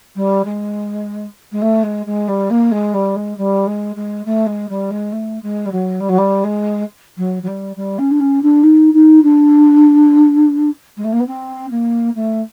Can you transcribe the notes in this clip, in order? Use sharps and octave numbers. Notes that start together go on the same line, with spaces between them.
G3
G#3
G#3
A3
G#3
G#3
G3
A#3
G#3
G3
G#3
G3
G#3
G#3
A3
G#3
G3
G#3
A3
G#3
G3
F#3
G3
F#3
G3
G#3
F#3
F#3
G3
G3
C#4
D4
C#4
D4
D#4
D#4
D4
G#3
A3
A#3
B3
C4
A#3
A3